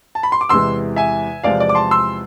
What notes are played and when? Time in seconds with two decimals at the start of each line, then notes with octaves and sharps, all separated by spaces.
0.15 A5
0.23 B5
0.32 C6
0.41 D6
0.49 E2 C3 E3 G#3 C6 E6
0.96 E5 G#5
1.43 E2 C3 F3 G#3 D5 F5
1.60 D5
1.69 D6
1.75 A5 C6
1.91 C6 E6